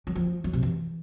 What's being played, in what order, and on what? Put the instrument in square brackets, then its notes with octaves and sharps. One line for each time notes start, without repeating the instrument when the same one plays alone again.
[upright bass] F#3
F3
F#3
C3
E3